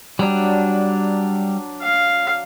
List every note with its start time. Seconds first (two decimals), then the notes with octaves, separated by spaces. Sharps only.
0.19 F#3 G3 D4
1.82 F5